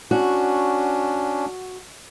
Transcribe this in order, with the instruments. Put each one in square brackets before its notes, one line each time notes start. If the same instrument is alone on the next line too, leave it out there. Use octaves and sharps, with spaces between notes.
[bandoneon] C#4 D4 [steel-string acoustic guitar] F#4